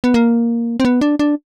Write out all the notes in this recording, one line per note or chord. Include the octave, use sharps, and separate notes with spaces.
B3
A#3
C4
B3
D4
D4